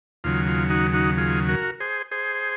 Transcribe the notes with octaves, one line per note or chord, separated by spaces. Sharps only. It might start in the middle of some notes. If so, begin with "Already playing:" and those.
D#2 C#3 F#3 F4
F4
D#4 F#4
D#4 F#4
F4 G#4
F#4 A#4
G#4 C5
G#4 C5